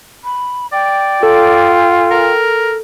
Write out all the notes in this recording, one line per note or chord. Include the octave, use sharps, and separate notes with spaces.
B5
D5 G5
F4 A4
A#4